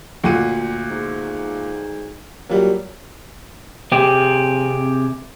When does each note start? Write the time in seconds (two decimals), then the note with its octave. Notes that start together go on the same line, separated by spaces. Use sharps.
0.24 D2 A#2 F#5 D#7
0.91 G#2
2.49 A#2 F#3 G3
3.92 C3 C4 G4 G#4